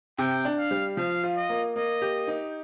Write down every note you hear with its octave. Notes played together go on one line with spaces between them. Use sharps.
C3 G5
D4
F5
G3
F3 F5
F4
D#5
A#3
A#3 D#5
G4
D#4